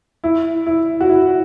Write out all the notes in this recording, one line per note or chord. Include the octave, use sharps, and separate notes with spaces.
E4
E4
F#4
E4